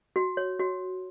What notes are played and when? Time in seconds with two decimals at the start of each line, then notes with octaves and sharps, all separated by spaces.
0.16 F#4
0.37 C#5
0.60 F#4